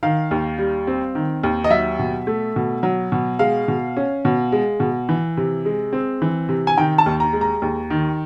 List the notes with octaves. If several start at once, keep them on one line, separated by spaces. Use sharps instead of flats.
D#3 F5
D#2
G3
C4
D#3
D#2
D#5
F#3 E5
B2
A3
B2
F#3
B2
G#3 F5
B2
C#4
B2
G#3
B2
E3
C3
G#3
C4
E3
C3
G#5
D#3 G5
A5
D#2
A#5
G#3
A#5
D#2
D#3